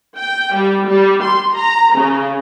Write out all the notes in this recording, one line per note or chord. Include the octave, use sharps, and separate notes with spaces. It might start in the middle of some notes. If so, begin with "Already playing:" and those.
G5
G3
G3
C6
A#5
C#3